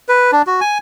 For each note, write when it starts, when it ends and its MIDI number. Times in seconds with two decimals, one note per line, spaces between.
0.09 0.31 71
0.32 0.42 62
0.47 0.60 66
0.61 0.78 80